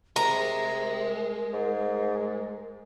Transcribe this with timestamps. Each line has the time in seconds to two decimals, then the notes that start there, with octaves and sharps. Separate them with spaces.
0.16 C3 G#3 A#4 A#5
1.53 G#2